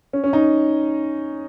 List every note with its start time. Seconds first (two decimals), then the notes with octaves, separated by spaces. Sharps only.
0.13 C#4
0.24 C#4
0.33 D#4